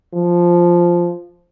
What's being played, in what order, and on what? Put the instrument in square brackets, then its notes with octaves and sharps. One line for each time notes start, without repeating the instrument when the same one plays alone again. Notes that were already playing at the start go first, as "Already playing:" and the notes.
[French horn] F3